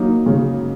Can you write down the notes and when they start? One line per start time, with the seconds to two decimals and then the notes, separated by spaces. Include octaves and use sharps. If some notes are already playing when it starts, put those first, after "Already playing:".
Already playing: F#3 A#3 D#4
0.26 C#3